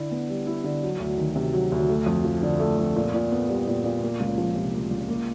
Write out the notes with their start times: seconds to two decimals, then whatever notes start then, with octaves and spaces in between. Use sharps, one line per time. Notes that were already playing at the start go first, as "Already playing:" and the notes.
Already playing: D3 E4
0.11 B3
0.29 G3
0.47 E4
0.64 D3
0.83 F#3
1.00 D2
1.18 D#3
1.36 C3
1.54 F#3
1.72 D2
1.89 A3
2.06 F2
2.25 F3
2.43 D3
2.60 A3
2.78 F2
2.96 A#2
3.14 A#2
3.32 B3
3.49 G3
3.67 A#2
3.84 A#2
4.02 A#3
4.20 C#2
4.38 F3
4.55 C3
4.74 A#3
4.91 C#2
5.08 A#3